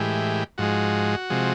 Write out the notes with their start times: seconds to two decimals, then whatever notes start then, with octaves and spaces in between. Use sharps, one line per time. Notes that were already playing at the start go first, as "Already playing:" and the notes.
Already playing: A2 E3 G#3 G4
0.58 G#2 F3 G#3 F#4
1.30 C3 F3 G#3